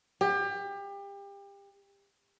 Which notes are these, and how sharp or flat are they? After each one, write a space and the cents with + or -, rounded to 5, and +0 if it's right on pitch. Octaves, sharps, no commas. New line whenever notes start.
G4 +30